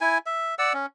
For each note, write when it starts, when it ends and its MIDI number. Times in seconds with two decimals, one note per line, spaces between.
0.01 0.18 64
0.01 0.18 80
0.26 0.55 76
0.59 0.73 74
0.59 0.73 78
0.59 0.73 88
0.74 0.86 61